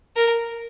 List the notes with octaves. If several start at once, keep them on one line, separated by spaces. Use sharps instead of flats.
A#4